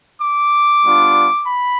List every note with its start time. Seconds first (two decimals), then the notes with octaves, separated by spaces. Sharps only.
0.22 D6
0.84 G3 B3 D4 F4
1.46 B5